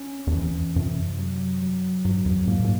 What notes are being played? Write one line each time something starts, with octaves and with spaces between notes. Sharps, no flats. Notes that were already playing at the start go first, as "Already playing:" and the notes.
Already playing: C#4
E2
F2 E3
F#2 C3
F#3
F#3
G2 F#3
F2
A2 A#3
A2